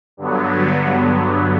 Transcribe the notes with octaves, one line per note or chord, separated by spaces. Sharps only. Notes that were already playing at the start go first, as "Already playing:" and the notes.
G2 D3 F#3 B3